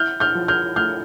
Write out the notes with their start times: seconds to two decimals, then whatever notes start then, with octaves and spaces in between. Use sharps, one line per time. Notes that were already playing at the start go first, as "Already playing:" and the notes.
Already playing: E4 F6 G6
0.20 F6 G6
0.35 F3
0.48 F6 G6
0.76 A3 F6 G6